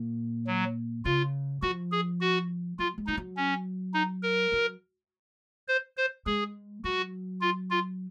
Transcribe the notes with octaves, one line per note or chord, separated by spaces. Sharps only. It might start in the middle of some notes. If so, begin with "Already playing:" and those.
Already playing: A#2
F#3
C#3 F4
F3 F#4
G#4
F#4
F#3 F4
G#3
F3 D#4
F#3
C#4
D#4
A#4
F#3
C5
C5
G#3 G#4
F#3 F#4
F4
F4